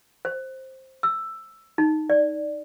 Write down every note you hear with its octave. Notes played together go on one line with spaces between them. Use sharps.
C5
E6
D#4
D5